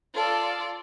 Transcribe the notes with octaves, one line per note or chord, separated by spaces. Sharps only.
F4 A4 D5